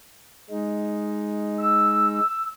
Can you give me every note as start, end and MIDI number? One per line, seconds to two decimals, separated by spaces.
0.50 2.20 56
0.50 2.20 63
1.60 2.52 88